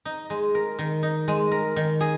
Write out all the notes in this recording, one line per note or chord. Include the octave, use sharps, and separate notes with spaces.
D#4
G#3
A#4
D#3
D#4
G#3
A#4
D#3
G#4